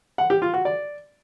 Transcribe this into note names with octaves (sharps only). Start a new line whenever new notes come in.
F#5
G4
F4
F#4
D5